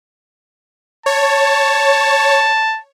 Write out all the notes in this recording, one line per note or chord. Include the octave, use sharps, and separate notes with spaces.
C#5 A5